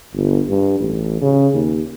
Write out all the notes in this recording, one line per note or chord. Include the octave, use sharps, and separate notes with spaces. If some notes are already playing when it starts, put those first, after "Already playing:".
G1
G2
A1
C#3
D#2